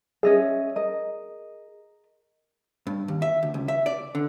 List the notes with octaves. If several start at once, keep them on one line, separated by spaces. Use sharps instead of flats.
C#4 G#4 D#5 E5
A#4 D#5
G2
D#2
E5
D2
C#2
E5
D5
D3